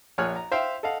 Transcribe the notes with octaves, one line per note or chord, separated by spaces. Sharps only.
A#1 C#5 G#5 F6 F#6
A#5
C5 E5 F5 G5
A4 D#5 F5 F#5